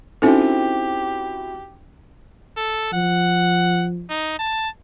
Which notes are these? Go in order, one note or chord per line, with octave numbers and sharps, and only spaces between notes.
C4 C#4 D#4 E4 F#4 G4 A4
A4
F3 F#5
D#4
A5